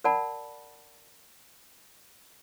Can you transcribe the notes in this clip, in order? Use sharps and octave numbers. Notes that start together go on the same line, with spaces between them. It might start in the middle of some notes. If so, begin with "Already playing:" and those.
A#4 D5 F#5 A5 B5